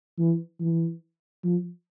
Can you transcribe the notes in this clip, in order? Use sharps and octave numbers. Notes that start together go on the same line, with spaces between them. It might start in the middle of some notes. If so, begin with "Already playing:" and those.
E3
E3
F3